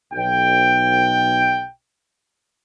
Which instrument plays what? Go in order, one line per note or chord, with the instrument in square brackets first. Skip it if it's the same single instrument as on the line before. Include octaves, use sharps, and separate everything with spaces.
[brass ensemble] B1 G5